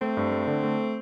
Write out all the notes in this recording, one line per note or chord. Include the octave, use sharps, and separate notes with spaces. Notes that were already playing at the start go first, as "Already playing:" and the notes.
A3 C4
G2
A3
D3
A3